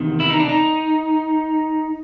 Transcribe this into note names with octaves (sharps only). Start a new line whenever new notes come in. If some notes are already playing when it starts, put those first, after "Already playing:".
Already playing: E2 C3 D#3
E4
D#4
D4
D#4